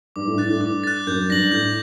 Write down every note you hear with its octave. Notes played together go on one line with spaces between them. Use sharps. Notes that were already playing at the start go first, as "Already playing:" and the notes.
G2 D6
A2
G2 F#6 A6
A2
G2 D6
F#6 A6
F#2 G6
G2 A#6 F#7
A2 G6